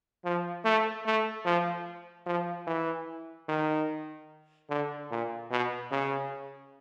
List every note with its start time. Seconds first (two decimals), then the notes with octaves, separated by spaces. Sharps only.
0.24 F3
0.65 A3
1.06 A3
1.45 F3
2.26 F3
2.67 E3
3.48 D#3
4.70 D3
5.11 A#2
5.51 B2
5.91 C#3